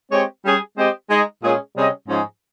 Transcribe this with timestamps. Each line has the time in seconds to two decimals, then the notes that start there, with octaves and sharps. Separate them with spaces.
0.11 G#3 C4 G4 C#5
0.44 G3 C#4 G#4
0.76 G#3 C4 G4 C5 D#5
1.09 G#3 D#4 G#4 D#5
1.42 A#2 G#3 C#4 G#4
1.76 C3 G3 C#4 G#4 D#5
2.09 G#2 F3 G#3 C#4 G#4